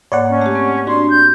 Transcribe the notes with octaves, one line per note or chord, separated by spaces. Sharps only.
G#2 A#3 C#5 D5 F#5
C#4
A3 G4
C4
D4 F#4 C6
G6